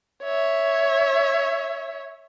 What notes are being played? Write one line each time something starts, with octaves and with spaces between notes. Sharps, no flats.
C#5 E5